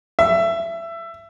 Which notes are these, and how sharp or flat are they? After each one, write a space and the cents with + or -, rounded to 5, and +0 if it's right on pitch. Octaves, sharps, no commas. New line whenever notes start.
E5 +20